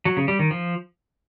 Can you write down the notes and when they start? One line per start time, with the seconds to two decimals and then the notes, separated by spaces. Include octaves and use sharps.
0.05 F#3
0.17 C#3
0.28 G3
0.39 D#3
0.51 F3